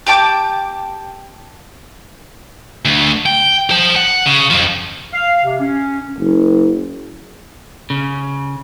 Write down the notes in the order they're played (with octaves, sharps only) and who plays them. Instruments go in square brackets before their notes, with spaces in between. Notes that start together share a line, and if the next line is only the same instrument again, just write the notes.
[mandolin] G4 G5 A5 D6
[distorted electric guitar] D2
G5
C5 A5
F#5
C#3
F2 F3
[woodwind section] F5
C3
C#4
[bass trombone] F#1
[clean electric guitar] C#3